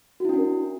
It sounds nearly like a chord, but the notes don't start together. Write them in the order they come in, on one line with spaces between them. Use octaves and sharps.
F#4 E4 D4 C#4 A#4